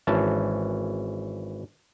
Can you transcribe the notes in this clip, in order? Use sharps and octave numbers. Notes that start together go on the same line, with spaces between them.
G#1 E3 C#4 A5